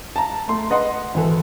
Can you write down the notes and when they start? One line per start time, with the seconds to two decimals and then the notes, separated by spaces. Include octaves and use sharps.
0.16 A5 A#5
0.48 A3 C6
0.70 B4 D#5 F#5 C6
1.14 G#1 E3 A4